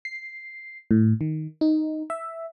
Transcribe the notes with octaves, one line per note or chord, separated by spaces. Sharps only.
C7
A2
D#3
D#4
E5